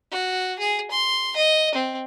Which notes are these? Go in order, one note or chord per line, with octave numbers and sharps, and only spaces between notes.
F#4
G#4
C6
D#5
C4